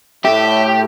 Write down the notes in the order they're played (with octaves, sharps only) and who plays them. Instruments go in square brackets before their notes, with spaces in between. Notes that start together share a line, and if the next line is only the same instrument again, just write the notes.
[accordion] A2 A3 [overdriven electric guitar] G4 [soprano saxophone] E5